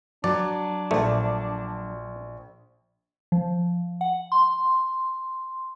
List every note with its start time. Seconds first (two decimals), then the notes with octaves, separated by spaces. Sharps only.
0.24 F#3 D4 D5
0.91 A#1 A3
3.32 F3
4.01 F#5
4.32 C6